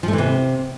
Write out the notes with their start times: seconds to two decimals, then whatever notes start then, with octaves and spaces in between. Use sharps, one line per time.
0.03 F3
0.08 A3
0.13 E3
0.18 C3